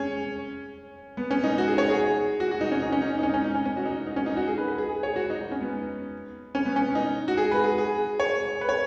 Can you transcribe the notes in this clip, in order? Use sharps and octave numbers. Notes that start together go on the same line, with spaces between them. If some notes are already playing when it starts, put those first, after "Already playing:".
Already playing: C#4 G#4 C#5
B3
C#4
D#4
F#4
G#4
C#5
G#4
F#4
F#4
D#4
C#4
D#4
C#4
D#4
D#4
C#4
D#4
C#4
D#4
C#4
C#4
F#4
D#4
D#4
C#4
D#4
F#4
G#4
B4
B4
G#4
G#4
C#5
F#4
D#4
D#4
C#4
B3
C#4
B3
C#4
D#4
F#4
G#4
B4
G#4
G#4
C#5
B4
C#5